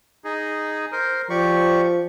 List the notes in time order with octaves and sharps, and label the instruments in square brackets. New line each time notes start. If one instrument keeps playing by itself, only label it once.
[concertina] D#4 G#4
A#4 C5
[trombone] F3 [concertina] G4 D5 C#6